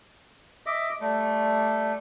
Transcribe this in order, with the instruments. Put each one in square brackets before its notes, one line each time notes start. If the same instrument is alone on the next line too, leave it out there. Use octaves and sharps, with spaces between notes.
[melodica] D#5 E5 D6
G3 A3